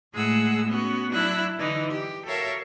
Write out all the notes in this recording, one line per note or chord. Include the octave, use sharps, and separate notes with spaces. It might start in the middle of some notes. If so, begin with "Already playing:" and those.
A2 G#3 G#4 F#5 E6
B3 C#4 F#4
F#3 D4 E4 E6 F#6
D3 E3 D#4
G4
F#4 A4 A#4 C#5 E5 F5